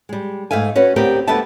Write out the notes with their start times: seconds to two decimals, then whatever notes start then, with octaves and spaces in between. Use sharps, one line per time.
0.09 G3 G#3
0.51 G#2 A3 E5 F5 G#5
0.76 C#4 F#4 B4 C#5
0.96 D2 B3 C4 G4 A#4
1.28 D2 D3 G3 B3 E5 A5